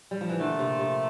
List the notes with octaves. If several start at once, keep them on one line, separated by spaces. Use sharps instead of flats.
G3
F3
E3
A#2 D3 F3 A3
C3
C3